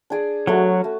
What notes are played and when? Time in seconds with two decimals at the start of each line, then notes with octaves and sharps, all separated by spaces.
0.10 D4 G#4 D5
0.47 F#3 A3 C#4 F#4 B4
0.84 A3